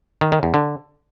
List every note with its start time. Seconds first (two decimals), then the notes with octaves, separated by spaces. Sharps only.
0.21 D#3
0.32 D#3
0.43 E2
0.54 D3